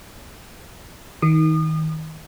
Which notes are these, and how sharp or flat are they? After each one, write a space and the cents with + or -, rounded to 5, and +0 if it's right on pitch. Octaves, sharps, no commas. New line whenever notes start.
D#3 +25 D#6 -35